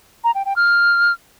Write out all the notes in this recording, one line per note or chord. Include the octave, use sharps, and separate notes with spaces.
A#5
G5
G5
F6